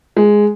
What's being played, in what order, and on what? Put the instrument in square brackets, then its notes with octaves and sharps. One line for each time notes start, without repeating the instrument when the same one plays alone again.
[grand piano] G#3